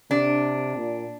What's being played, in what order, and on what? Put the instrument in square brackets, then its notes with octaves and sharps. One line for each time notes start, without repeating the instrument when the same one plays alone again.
[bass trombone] C3 [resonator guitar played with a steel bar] D4
[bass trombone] A#2